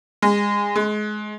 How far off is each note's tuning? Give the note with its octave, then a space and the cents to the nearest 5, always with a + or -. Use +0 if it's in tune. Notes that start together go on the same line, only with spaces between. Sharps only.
G#3 -25
G#3 +25